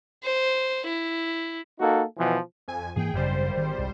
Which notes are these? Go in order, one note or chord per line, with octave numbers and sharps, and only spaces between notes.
C5
E4
A#3 D#4 F#4 A4
B2 E3 F3
F2 G#5
G#2 E3 A#3 G#4 G5
G#1 F#2 C#3 G3 C5
D#3
C2